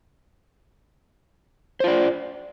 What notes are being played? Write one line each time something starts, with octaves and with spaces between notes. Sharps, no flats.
F4 C5 D5